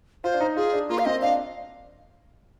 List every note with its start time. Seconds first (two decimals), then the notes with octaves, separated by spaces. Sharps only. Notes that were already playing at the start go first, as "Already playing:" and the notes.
0.24 F4 C5
0.34 D4
0.40 D#4
0.56 F4 G#4
0.73 D4
0.89 A#3 F4
0.98 F5
1.05 C4 D#5
1.22 D4 F5